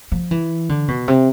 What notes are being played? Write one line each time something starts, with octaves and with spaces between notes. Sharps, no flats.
F3
E3
D3
B2
C3